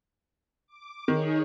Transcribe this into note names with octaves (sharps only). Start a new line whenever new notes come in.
D6
D#3 D#4 G#4 C#5